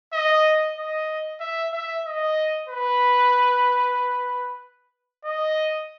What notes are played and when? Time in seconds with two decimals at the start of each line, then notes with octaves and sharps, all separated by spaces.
0.13 D#5
0.77 D#5
1.40 E5
1.73 E5
2.05 D#5
2.68 B4
5.25 D#5